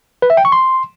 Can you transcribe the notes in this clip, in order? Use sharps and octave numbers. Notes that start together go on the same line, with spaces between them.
B4
E5
G5
C#6
C6